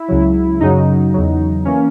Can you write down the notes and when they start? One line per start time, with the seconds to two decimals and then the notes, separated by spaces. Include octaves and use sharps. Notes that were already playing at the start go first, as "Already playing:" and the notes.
Already playing: E4
0.08 C#2 C#3 F#3
0.60 F#2 C#3 F#3 D#4
1.14 E2 C#3 F#3
1.65 E3 A#3 C#4